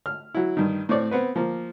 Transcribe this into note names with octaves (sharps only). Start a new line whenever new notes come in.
F6
F#3 E4
G2 D#3
A2 C4 C#5 D5
B3 C4 B4
F3 A#3